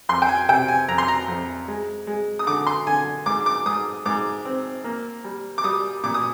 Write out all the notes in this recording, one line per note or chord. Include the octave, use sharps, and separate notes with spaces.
F2 C6
G5
G#5
C3 G5
G#5
F2 A#5
C6
A#5
F2
G#3
G#3
D#6
D3 D6
C6
D3 G#5
G#2 D6
D6
G#2 D#6
G#2 D6
C4
A#3
G3
D6
G3 D#6
A#2 D6
D#6